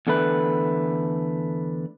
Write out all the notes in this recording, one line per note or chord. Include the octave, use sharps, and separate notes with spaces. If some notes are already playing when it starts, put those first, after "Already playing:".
E2 D3 A3 B4